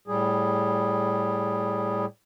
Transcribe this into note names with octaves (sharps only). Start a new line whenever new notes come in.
A2 G3 G#4